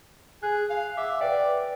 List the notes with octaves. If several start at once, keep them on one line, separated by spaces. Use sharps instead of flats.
G#4 F#6
F5
E5 F#5 D6
B4 D5 G5